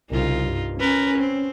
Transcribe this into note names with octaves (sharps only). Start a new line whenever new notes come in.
C2 C#3 D#4 F4
G2
C#4 A#4 B4
C4